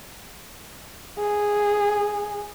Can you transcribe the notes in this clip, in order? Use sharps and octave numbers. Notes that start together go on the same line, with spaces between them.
G#4